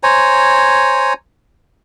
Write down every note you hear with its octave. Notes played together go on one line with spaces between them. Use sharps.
C5 C#5 G#5 A#5